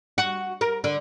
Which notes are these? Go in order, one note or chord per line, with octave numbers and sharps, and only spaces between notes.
F#4
A#4
D3